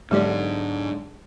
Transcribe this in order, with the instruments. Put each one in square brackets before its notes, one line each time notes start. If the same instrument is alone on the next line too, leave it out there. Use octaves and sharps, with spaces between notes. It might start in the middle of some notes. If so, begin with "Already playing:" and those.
[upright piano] B1 D3 [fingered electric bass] G#2 [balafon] G#3 G4 D5 [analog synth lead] D4